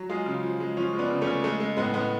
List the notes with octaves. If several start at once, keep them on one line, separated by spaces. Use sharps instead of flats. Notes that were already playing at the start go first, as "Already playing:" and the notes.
Already playing: F#3
G#3 F4 G#4
C#3
F3
G#3
F3 C#4 F4
G#3
B3 D4
C#3
A3 C#4
C#3
G#3 A3
G#3 A3
A2 G#3 B3
A2 G#3 B3